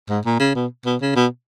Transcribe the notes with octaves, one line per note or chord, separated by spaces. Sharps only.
G#2
A#2
C#3
B2
B2
C#3
B2